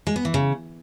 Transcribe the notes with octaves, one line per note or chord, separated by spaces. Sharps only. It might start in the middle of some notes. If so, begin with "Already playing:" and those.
G#3
B3
E3
C#3